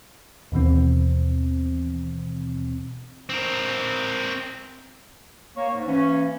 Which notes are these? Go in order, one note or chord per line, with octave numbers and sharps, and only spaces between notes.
D#2 B2 E3 C4
C4 A#4
A#3 C#5
G#2
E3 A#3 C#4